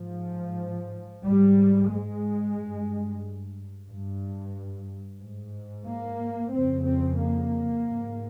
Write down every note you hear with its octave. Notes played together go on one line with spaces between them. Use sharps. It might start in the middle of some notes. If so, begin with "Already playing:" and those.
Already playing: G#2 F3
G#2 G3
G#3
G2
G2
G#2
A#3
F2 C#3 C4
C4
A#3
G#2